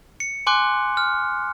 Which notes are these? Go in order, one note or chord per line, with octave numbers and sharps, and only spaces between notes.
C#7
G#5 C6 D6 F#6
F6